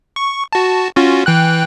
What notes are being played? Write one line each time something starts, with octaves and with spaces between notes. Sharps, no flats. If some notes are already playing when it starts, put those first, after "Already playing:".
C#6
F#4 A5
C#4 F4 F#4
E3 G5 F#6